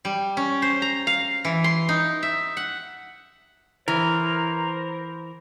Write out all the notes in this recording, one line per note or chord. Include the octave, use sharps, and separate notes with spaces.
G3
C#4
C5
A#5
F5
E3
C6
D#4
E5
F#5
E3 A#4 C5